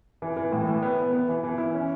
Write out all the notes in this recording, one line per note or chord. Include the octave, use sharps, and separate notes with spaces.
E3
E3
A2
E3
B3
B3
B3
E3
E3
E4
C#4